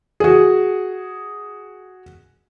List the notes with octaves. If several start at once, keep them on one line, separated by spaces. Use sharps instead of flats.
F#4 G#4